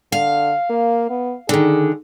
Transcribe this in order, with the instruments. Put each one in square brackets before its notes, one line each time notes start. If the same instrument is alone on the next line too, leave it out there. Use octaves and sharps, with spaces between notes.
[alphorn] D3 [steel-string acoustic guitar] F5
[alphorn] A#3
B3
[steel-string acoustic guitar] D3 D#3 [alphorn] G#4